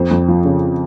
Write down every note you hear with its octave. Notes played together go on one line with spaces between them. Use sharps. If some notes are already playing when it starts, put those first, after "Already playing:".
Already playing: F2 C5
F2
F3
C#3